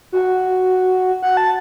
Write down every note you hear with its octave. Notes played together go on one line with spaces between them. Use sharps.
F#4
F#5
A5